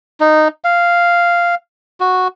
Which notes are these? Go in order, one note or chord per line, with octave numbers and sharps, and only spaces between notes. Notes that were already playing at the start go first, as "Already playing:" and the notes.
D#4
F5
F#4